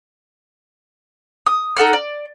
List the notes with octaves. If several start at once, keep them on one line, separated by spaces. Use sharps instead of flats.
D#6
D#4 A4 F#5 F6
D5